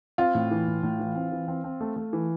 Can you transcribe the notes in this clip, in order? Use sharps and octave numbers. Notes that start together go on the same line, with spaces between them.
C4 F4
A2
E3
A2
A2
E3
C4
E3
C4
C4
A3
A3
E3